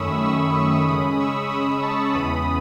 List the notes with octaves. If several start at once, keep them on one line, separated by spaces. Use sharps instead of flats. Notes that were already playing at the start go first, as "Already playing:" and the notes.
Already playing: F#2 D#3 A3 C#4 B5 C#6 D#6 E6
C#6 E6
C#6 E6
C#3 G#3 C#4 B5 D#6
C#6 E6
B5 D#6
A5 C#6
E2 C#3 E3 B3 B5 D#6